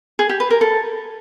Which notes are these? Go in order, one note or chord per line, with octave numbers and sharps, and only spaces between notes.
G#4
G4
B4
A#4
A4